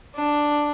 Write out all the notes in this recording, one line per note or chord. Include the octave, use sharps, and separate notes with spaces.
D4